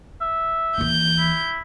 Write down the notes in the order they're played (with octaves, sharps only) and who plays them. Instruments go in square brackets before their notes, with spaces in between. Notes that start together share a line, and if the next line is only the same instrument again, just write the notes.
[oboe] E5
[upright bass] D#2 E3 [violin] G6
[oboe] E4